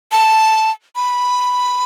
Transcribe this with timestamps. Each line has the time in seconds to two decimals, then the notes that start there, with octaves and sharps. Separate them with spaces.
0.12 A5
0.96 B5